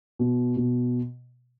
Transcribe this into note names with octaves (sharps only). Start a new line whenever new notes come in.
B2
B2